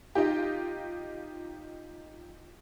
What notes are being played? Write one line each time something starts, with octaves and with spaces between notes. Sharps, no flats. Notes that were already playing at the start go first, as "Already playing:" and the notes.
D#4 F4 G4